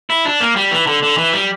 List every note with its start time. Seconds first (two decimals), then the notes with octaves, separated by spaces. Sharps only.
0.10 E4
0.25 D4
0.40 A#3
0.56 G3
0.71 E3
0.87 D3
1.03 D3
1.18 E3
1.33 G3